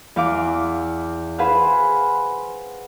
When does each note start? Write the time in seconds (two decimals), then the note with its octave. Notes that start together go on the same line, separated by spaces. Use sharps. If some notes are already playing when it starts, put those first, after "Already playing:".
0.16 E2 F5 D6
1.38 G#4 B4 C5 F5 F#5